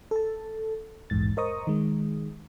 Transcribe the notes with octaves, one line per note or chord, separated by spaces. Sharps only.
A4 A5
A#1 E2 G#2 A6
A#4 C5 D#5 A#5 C#6 D#6
D#3 G#3